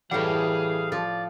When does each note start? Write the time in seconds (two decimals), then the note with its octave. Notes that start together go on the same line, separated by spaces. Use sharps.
0.11 A2 E3 G3 G#4 F5 F#5
0.92 F3 D5